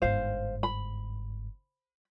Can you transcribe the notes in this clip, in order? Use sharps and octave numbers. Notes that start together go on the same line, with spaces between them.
G1 G#2 C5 F5
B5